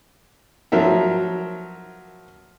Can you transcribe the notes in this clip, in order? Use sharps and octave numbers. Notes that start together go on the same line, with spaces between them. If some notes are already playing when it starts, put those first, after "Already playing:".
F3 F#3 A#4 E5